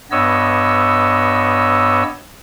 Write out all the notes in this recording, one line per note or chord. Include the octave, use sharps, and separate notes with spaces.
G2 B3 C#5 D#5 E6